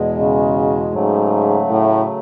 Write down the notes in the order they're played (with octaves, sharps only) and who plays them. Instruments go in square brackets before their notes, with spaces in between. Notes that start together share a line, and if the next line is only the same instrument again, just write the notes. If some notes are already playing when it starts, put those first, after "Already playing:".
Already playing: [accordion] E2 B2 G#3
[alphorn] C#3
[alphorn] G#2 [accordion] C#3 F#3 A3
[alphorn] A2